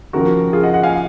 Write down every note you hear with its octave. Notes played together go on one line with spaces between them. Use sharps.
D#2 C#3 F3 F#4 A#4
F4 G#4
D#5 F#5
D#5 F#5
F5 G#5